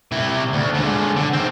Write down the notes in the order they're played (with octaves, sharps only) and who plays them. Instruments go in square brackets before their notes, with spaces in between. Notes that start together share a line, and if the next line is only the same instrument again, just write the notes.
[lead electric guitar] C3 E4
D2
D3 G#3
D3
D#3 C4